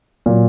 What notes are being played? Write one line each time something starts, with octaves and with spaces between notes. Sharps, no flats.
A#2 F#3